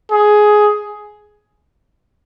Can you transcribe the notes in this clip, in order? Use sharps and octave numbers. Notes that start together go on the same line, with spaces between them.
G#4